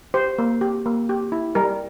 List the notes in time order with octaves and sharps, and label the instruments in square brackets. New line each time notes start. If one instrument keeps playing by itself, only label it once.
[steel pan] G4 C5
A#3
G4
A#3
G4
E4
G3 A#4